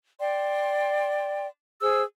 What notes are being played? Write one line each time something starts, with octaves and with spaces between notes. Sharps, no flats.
D5 G5 C6
G#4 C5 E6